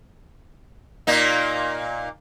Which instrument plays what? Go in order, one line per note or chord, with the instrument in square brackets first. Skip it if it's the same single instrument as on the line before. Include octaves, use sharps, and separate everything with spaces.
[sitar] A#2 A#3 D#4